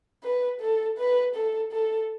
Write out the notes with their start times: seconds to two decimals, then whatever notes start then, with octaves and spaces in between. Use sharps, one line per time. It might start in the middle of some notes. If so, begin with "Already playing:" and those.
0.23 B4
0.60 A4
0.98 B4
1.35 A4
1.72 A4